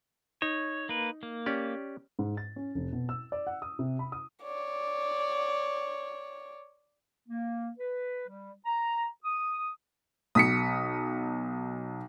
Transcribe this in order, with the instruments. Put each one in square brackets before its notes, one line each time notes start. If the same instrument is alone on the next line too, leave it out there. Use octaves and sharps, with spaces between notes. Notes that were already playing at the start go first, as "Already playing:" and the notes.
[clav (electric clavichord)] D#4 [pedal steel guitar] C#5
[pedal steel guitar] A#3 B4
A#3
[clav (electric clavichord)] C#4 G4 D5
[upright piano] G#2
A6
C#4
F1
B2
E6
D5
F#5
D#6
C3
B5
D#6
[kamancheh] C#5 D5
[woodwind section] A#3
B4
G3
A#5
D#6
[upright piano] B1 [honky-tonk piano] D#6 B6 C#7